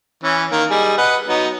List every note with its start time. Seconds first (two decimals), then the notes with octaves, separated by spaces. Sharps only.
0.24 E3 C#4
0.51 D#3 A#3
0.70 G3 G#4 D#5
0.98 B4 D#5 F#5
1.28 F#3 B3 D#4